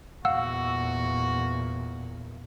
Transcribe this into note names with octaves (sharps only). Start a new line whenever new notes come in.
E2 A#2 F#4 F5 F#5 E6